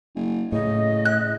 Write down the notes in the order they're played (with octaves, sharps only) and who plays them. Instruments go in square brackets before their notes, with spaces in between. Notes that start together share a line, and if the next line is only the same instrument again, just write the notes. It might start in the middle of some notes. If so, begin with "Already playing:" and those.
[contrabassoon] F#1
[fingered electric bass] A2 [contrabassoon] C#3 [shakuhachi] D#5
[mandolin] F#6